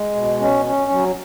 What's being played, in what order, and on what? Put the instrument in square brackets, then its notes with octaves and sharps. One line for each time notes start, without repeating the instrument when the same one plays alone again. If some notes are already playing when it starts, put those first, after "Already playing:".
Already playing: [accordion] G#3
B2
C#4
C#4
F#3